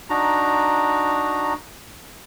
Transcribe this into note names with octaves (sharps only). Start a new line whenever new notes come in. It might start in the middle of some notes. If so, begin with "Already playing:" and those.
D4 D#4 F#4 A#5